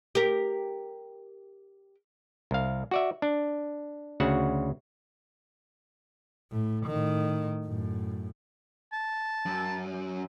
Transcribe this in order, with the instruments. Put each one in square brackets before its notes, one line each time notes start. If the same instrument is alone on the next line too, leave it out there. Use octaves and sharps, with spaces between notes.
[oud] G4 A#4
[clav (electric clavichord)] C2 F5
F#4 D5 E5
D4
D2 C#3 F#4 F#5
[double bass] A2
A2 D#3
F#2 A2
[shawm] A5
[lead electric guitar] F#2